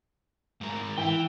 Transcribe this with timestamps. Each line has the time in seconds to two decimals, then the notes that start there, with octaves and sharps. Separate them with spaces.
0.61 G#2 A#4
0.98 E3 G5